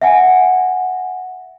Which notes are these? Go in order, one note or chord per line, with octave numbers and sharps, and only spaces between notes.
E5 F#5 G#5